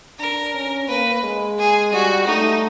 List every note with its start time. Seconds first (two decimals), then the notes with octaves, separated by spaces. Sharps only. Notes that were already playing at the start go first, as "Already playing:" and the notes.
0.20 D4 A#4
0.54 C#4
0.88 A#3 B4
1.23 G#3
1.59 G#4
1.94 G3 F#4
2.28 A3 D#4